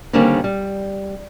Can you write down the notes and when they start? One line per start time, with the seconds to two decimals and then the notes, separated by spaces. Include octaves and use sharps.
0.13 D3 D#3 G3 A#3 C4 C#4
0.44 G3